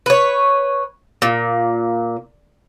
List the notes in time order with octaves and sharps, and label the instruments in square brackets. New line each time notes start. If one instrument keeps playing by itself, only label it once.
[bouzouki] B4 C#5
A#2